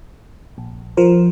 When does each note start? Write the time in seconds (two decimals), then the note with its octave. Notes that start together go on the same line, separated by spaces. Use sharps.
0.58 A#1
0.97 F3 A#4 C5